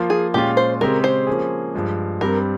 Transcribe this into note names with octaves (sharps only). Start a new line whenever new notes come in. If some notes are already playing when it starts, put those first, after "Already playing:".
Already playing: F3 A#3 F4
G#4
A#2 G#3 C#4 F4 G4
C5
C#3 G#3 C4 G4 A#4
C5
F3 A#3 C#4 G#4
G2 F3 G#3
G2 G3 C4 A#4